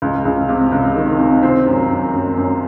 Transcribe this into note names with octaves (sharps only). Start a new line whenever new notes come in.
C#2
C#2
C3
C#2
D#3
C3
C4
F#2
F#2
F#2
F#2